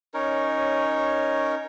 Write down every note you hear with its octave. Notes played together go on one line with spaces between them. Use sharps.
C#4 D#4 A#4 C#5